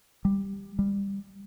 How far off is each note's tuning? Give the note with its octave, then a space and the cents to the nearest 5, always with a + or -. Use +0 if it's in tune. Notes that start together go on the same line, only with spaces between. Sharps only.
G3 +10
G3 +20